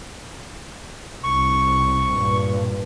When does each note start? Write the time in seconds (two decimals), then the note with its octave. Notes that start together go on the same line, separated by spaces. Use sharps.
1.24 C2 C#6
2.12 G2 A#2